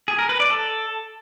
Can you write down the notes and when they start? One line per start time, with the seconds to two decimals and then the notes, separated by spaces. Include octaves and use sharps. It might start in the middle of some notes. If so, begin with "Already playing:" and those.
0.08 G#4
0.19 A#4
0.29 B4
0.40 D5
0.50 A4